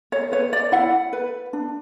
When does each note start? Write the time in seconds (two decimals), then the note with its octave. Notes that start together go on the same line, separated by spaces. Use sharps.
0.12 C#5
0.32 B4 C#5
0.53 D5
0.72 E4 F#5
1.13 B4
1.53 D4